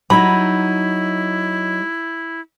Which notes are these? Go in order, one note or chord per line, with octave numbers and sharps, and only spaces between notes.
F#3 D#4 E4 B5